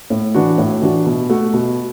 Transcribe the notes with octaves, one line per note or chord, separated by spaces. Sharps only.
A2
E3 D4 F#4
A2
E3 D4 F#4
B2
A3 F#4
B2